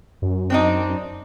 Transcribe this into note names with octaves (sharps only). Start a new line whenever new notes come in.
F#2
C4 D4 D#4